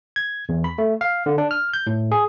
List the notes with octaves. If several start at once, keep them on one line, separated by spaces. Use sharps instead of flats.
G#6
E2
B5
A3
F5
D3
D4
F6
G6
A2
G#4